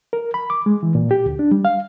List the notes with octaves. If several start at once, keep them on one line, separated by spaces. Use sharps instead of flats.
A#4
B5
D6
G#3
E3
A#2
G4
D2
D4
G3
F5